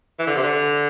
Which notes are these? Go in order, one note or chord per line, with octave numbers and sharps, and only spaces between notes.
E3
D3
C3
D3